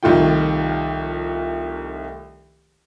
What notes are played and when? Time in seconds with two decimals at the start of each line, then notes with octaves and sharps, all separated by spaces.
0.03 C2 D#3 F3 A3 F4 G5